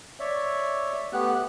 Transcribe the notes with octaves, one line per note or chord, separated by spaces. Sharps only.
C#5 D5 E5
A3 B3 G4 F#6